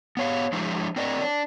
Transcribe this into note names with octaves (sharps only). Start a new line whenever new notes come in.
B3 C#5 F5
F3 G#3 D4 E4 C5
C4 A#4 D5 D#5
D4